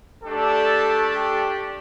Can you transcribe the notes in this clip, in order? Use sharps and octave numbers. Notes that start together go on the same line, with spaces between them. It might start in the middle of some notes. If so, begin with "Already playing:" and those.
A3 D4 G4 A4
G4